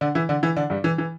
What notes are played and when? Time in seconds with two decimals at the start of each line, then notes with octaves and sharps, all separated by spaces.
0.01 D3 D4
0.15 E3 E4
0.29 D3 D4
0.43 E3 E4
0.56 D3 D4
0.70 G2 G3
0.84 E3
0.98 E3